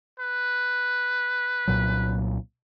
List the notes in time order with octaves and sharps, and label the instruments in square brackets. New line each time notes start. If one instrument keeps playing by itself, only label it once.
[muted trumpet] B4
[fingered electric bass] C2 A#2 F#3